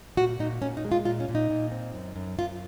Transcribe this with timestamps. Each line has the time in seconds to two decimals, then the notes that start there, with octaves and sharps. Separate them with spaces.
0.17 A#2 F#4
0.39 A#2 D#4
0.62 A#2 C#4
0.77 D#4
0.85 G#3
0.92 F4
1.05 A#2 F4
1.20 C#4
1.29 A#2
1.35 D#4
1.50 A#2
1.72 C4
1.94 F#2
2.16 F#2
2.38 F#2 F4